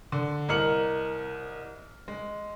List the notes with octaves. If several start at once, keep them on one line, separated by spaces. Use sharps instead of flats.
D3
C2 A#4 D#5 F6 C#7 F#7
G#3